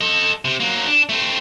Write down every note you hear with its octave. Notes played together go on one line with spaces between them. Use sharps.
A4 D#5
C3
F#3 A#3
D4
A3 C4